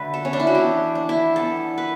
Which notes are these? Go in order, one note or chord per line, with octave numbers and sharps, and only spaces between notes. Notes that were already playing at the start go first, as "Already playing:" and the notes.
Already playing: D3 F#3 A3 B4
A4
C#4
D4
E4
F#4
E3 B3 G4
D4
E4
E3 G3 B3 A4
B4